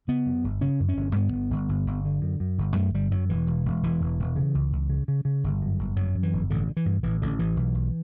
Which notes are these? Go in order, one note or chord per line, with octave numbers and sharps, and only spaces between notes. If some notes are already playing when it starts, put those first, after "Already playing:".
C#3 B3
F#2
G1
C#3 C#4
F#2
C#4
G1
G2 B3
G1
G1
G1
G1
D3
F#2
F#2
G1
F#2 A3
G1 G3
F#2 F#3
E1 E3
E1
E1
E1 E3
E1
E1
C#3
C#2
C#2
C#3
C#3
C#3
G1
F#2
G1
F#2 F#3
F#2
E3
G1
A1 D3
D3
E3
G2
A1 E3
A1 D3
A1 E3
B1
B1